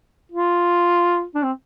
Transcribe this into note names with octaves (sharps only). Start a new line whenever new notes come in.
F4
D4
C4